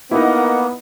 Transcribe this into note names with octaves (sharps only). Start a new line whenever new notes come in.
A#3 B3 D#4 E4 A#4 D#5 F#5